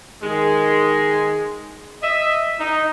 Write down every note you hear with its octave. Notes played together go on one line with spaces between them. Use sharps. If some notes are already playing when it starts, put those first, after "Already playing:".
D#3 G#3
D#5 E5
D#4